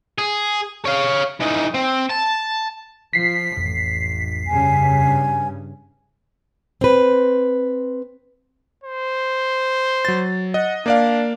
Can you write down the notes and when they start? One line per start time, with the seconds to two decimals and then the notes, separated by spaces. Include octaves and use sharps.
0.19 G#4
0.86 C#5 F5
1.40 E3 D#4
1.74 C4
2.10 A5
3.13 F3 B6 C7
3.57 A1 F2
4.47 G2 C#3 G#5
6.81 C4 B4
8.84 C5
10.05 F#3 A6
10.54 D#5 F#5
10.86 A#3 D4 D5 F5